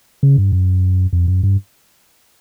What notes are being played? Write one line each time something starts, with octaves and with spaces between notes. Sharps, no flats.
C#3
G2
F#2
F2
F#2
G2